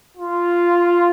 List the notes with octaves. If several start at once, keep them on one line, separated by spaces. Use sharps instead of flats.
F4